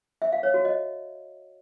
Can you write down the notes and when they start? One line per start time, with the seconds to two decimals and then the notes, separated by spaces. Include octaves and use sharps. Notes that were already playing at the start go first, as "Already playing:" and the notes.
0.22 E5
0.32 F5
0.43 C#5
0.54 F#4
0.65 D#5